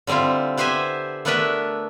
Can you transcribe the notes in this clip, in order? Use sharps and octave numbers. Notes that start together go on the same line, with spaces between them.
D3 G3 C4 E4 F4
B3 G4 C5 E5 G#5
A3 B3 D4 A#4 B4 E5